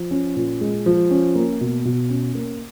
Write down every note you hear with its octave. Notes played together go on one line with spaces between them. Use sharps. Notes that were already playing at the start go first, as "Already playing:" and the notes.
Already playing: F3
C#4
A#2
G#3
F3
C#4
A#3
B2
B2
C#4
A#3